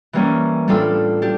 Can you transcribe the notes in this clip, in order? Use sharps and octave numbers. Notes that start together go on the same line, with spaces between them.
E3 G3 A#3 C#4
A2 G3 D4 F4 A4
D4 G4